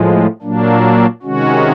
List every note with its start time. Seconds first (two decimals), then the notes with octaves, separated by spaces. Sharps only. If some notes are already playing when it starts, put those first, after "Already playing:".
Already playing: A2 F3 G#3
0.42 A#2 F#3 A#3 D4
1.22 C3 D#3 G#3 C#4 F#4